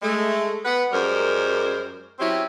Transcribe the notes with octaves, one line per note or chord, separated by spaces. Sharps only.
G#3 A3
B3 B4 F#5
F#2 G3 G#3 A#4 C5
F#3 C4 C#4 E4 G4